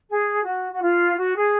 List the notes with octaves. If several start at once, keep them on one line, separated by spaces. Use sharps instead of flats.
G#4
F#4
F#4
F4
F#4
G#4